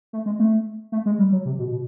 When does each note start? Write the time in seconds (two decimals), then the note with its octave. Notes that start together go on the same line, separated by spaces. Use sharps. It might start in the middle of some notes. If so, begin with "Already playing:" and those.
0.13 A3
0.26 G#3
0.39 A3
0.92 A3
1.06 G#3
1.19 G3
1.32 F#3
1.45 C3
1.59 B2
1.72 B2